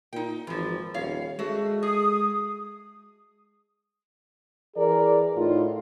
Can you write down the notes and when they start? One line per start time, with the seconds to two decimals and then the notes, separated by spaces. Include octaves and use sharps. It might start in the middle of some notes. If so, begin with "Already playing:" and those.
0.13 A#2 D#4 G5
0.47 G#1 E3 F3
0.94 D#1 C#5 F5
1.39 G#3 A3 F#4
1.83 G#4 D#6
4.76 E3 G#4 A#4 D5
5.36 A2 D#4 F4